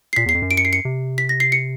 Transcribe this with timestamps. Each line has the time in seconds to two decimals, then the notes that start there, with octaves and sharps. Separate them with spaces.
0.13 C7
0.16 A#2 B6
0.26 E2
0.29 C7
0.35 F2
0.42 F#2
0.51 D7
0.57 C#7
0.65 C7
0.73 C#7
0.85 C3
1.18 B6
1.29 A#6
1.40 C7
1.52 C#7